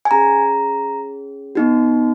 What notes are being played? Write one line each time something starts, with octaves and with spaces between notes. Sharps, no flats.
G#5
C#4 G#4 A#5
B3 D#4 F#4